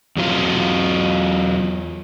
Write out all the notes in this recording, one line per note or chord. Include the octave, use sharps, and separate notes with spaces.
E2 F#3 F4